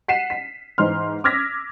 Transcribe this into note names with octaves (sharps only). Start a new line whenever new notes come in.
F#5 B6 C7 D#7 E7
B6
G#2 E3 C5 C6 F6
D6 E6 F6 G#6 A#6 B6